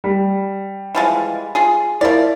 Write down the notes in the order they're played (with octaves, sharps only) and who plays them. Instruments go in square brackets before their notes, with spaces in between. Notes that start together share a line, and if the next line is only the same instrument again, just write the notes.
[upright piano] G3
[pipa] E3 F3 G#3
F4 G#4
[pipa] F3 D5 [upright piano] E4 A#4